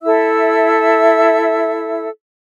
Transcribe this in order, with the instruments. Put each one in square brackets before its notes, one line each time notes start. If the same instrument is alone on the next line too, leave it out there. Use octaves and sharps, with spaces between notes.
[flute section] E4 A4 E5 E6